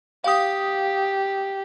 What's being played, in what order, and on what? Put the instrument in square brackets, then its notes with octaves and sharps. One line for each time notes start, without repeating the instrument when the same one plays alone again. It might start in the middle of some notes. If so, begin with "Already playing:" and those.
[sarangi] G4 [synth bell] F5 D#6